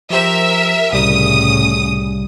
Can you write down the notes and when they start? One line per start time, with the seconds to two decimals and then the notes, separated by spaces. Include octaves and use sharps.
0.10 F3 G4 A#4 C5 E5
0.93 C2 A2 C#3 G3 D#6